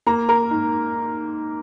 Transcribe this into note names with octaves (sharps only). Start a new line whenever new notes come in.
A#3 A#5
A#4 A#5
G#2